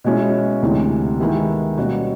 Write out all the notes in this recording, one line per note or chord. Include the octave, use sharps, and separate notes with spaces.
B2 G#3 C#4 E4
D2 C3 E3 G#3
D#3 G#3 B3 E4 G4
B2 G3 A#3 C#4 F#4